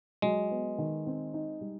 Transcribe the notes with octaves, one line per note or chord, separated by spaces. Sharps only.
F#3 G#3
B3
D#3
C4
D#4
G3